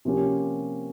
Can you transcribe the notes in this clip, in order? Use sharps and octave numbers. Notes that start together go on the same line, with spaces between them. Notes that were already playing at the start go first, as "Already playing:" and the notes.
C3 F3 A#3 C#4 G4